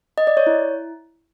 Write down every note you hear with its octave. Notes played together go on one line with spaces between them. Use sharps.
D#5
D5
C#5
E4